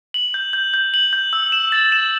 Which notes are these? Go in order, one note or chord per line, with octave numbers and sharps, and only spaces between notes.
F#7
G6
G6
G6
F#7
G6
E6
E7
A6
E7